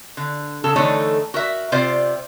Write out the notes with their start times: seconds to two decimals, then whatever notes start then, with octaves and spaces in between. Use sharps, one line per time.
0.17 D3
0.64 C#3 A4
0.76 D3 E3 A3 D#4 A4 C#5
1.34 F#4 A#4 E5
1.72 C3 F4 C5 D5